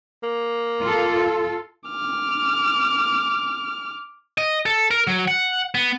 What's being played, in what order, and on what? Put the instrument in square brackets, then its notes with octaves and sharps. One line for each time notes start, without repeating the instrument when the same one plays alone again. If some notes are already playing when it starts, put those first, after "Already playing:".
[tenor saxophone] A#3
[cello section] F4 A4
[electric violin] D6 F6
[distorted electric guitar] D#5
A4
A#4
F#3
F#5
B3